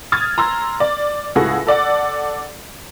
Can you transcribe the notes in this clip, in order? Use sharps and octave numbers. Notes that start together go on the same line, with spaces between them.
D#6 F6 G#6 A6
A#5 C6 E6 A6
D5
C#2 A2 F#4 G#4 A4 A#6
A4 D5 F#5